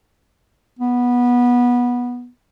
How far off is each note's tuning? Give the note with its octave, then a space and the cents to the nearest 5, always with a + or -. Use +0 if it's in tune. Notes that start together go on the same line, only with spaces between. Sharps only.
B3 -15